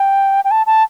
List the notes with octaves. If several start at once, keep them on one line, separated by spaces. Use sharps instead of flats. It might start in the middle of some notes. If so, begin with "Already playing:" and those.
Already playing: G5
G5
A5
A5